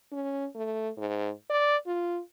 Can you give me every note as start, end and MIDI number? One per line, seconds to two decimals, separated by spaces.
0.12 0.46 61
0.55 0.90 57
0.97 1.31 44
1.50 1.77 74
1.87 2.21 65